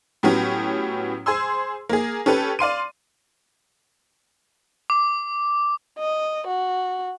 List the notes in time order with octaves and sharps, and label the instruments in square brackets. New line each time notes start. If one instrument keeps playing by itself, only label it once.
[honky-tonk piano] A2 F#3 B3 C#4 G4
G#4 C5 G#5 C6 E6
A#3 G#4
C#4 G4 A4 B4
D5 F5 C6 D#7
[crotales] D6
[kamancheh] D#5
F#4